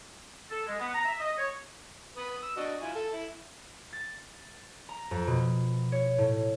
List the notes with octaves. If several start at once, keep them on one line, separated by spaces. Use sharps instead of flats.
A4
G#3
B3
A#5
E5
D#5
C#5
B4 B5 D#6
E6
D4 F#4 D#5
E4 F4 G#5
A4
E4
A6
A#5
F2
B2
C#5
A2